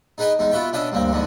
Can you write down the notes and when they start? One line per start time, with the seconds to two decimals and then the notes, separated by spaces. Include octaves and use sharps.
0.18 D#4 G#4 B4 D#5 G5 G#5
0.39 E2 G#3 D#4
0.51 B3 F4 F#4 B4 E5 G5
0.73 B2 C#4 D4 E5 G5 D#6
0.92 D2 G2 A#3 C4
1.12 F2 G#2 D3 B3